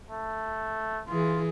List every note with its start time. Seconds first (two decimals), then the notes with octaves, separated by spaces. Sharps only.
0.11 A3
1.08 E3 F4 G#4